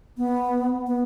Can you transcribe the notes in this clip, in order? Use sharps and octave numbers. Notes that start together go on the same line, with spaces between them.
B3
B3